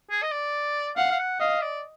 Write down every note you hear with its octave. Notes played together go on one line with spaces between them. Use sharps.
G#4
D#5
D5
F5 F#5
F5
F#5
D#5 F5
D5